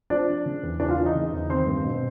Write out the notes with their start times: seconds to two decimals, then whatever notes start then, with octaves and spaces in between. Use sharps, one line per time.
0.10 F3 D4 D5
0.28 F3
0.46 C#3
0.63 E2
0.80 E3 D4 D5
0.89 F4 F5
0.98 E3
1.06 D#4 D#5
1.15 C#3
1.32 E2
1.50 D#3 C4 C5
1.67 G2
1.84 B2